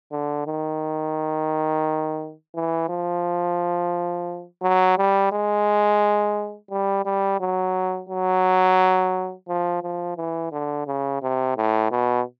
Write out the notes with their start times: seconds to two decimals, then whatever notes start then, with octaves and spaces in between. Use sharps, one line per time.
0.11 D3
0.46 D#3
2.55 E3
2.89 F3
4.62 F#3
4.98 G3
5.32 G#3
6.71 G3
7.05 G3
7.40 F#3
8.09 F#3
9.48 F3
9.83 F3
10.17 E3
10.52 D3
10.87 C#3
11.22 C3
11.56 A2
11.91 B2